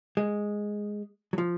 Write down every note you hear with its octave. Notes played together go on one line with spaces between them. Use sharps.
G#3
F#3
F3